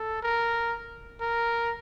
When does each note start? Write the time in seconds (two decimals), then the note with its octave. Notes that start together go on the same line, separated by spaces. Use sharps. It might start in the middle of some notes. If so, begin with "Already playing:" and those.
Already playing: A4
0.23 A#4
1.21 A#4